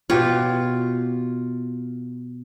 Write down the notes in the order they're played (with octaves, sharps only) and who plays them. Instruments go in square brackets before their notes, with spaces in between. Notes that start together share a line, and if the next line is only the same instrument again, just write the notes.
[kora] B2 G4 C#5 [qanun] F4